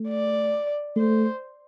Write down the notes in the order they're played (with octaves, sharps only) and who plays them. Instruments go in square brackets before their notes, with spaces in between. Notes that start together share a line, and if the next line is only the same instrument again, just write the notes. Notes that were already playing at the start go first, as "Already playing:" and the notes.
Already playing: [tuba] A3
[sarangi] D5
[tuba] A3 [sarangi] C5